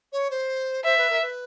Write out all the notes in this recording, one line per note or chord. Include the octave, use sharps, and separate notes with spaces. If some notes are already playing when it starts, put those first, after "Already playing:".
C#5
C5
C5 E5
B4
A#4
B4